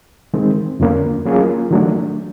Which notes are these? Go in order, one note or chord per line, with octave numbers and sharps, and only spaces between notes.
D#3 G#3 C4
F2 D3 F3 A#3 C#4
F#3 A#3 C#4 F4 G#4
D#3 F#3 A3 D4